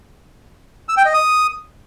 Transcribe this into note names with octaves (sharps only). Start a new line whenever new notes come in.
E6
G5
D#5
D#6